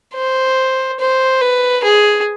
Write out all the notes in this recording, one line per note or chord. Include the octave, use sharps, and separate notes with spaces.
C5
C5
B4
G#4